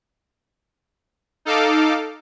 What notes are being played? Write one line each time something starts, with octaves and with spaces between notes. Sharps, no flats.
D#4 A4 F5 D6